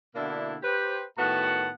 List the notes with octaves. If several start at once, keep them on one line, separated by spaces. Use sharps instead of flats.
B2 D3 A#3 D4 E4
G4 B4 C5
A2 D#3 B3 F#4 F#5 A5